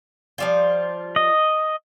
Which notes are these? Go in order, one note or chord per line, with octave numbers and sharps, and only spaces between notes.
F3 G3 F4
D#5